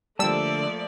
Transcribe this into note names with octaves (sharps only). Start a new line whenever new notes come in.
D3 F3 G3 A3 A#3 D5 A5 E6